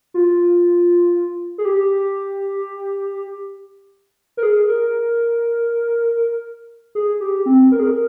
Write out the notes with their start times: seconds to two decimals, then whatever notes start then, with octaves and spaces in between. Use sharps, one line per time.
0.14 F4
1.58 G#4
1.65 G4
4.37 A#4
4.43 G#4
4.68 A#4
6.95 G#4
7.20 G4
7.46 C4
7.72 A#4
7.79 G#4
7.87 A#4